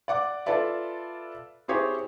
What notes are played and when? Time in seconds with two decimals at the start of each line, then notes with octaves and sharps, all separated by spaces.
0.08 D5 F#5 D6
0.46 F4 A4 B4 D5 E5
1.68 C4 E4 G4 G#4 C5 C#5